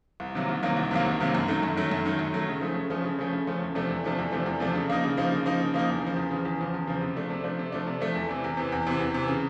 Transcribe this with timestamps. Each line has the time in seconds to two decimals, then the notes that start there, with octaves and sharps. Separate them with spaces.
0.20 C2
0.35 C3 D#3 F#3 A#3
0.49 C2
0.63 C3 D#3 F#3 A#3
0.77 C2
0.91 C3 D#3 F#3 A#3
1.06 C2
1.20 C3 D#3 F#3 A#3
1.35 F#2
1.48 D#3 F#3 A3
1.63 F#2
1.77 D#3 F#3 A3
1.91 F#2
2.05 D#3 F#3 A3
2.19 F#2
2.33 D#3 F#3 A3
2.48 C#3
2.61 F3 A3 C#4
2.76 C#3
2.90 F3 A3 C#4
3.04 C#3
3.19 F3 A3 C#4
3.32 C#3
3.47 F3 A3 C#4
3.61 E2
3.75 C3 F3 A3 D4
3.89 E2
4.04 C3 F3 A3 D4
4.18 E2
4.32 C3 F3 A3 D4
4.46 E2
4.60 C3 F3 A3 D4
4.75 C#3
4.88 F3 A#3 D#4
5.03 C#3
5.17 F3 A#3 D#4
5.31 C#3
5.45 F3 A#3 D#4
5.60 C#3
5.74 F3 A#3 D#4
5.88 E2
6.02 C#3 F3
6.16 E2
6.30 C#3 F3
6.45 E2
6.59 C#3 F3
6.74 E2
6.87 C#3 F3
7.01 C3
7.16 F3 A3 D4
7.30 C3
7.44 F3 A3 D4
7.59 C3
7.72 F3 A3 D4
7.87 C3
8.01 F3 A3 D4
8.15 E2
8.29 C3 E3
8.44 E2
8.57 C3 E3
8.72 E2
8.87 C3 E3
9.00 E2
9.14 C3 E3
9.28 C#3